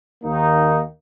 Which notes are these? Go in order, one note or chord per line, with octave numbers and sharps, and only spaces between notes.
D#2 D#3 A#3 D#4